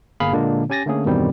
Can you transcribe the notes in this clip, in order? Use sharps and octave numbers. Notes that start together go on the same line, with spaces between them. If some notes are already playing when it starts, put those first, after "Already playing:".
G1 A#3 G#4 F5 B5
A#2 D3 G#3 A#3 D4
C#4 G4 G#5 A6 A#6
D3 A3 A#3 C#4 G#4
E2 G2 B2 D#3 G3 C4